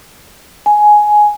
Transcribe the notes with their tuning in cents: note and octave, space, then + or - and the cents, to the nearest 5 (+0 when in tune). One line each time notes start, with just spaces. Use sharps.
G#5 +10